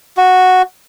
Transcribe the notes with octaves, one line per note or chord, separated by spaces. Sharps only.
F#4